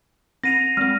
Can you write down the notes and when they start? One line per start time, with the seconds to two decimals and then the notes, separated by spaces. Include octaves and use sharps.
0.44 C4 A#6 C7 D#7 F7
0.77 G#3 C4 F6